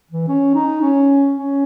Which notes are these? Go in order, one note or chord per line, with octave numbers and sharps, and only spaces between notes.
E3
C#4
D#4
C#4
C#4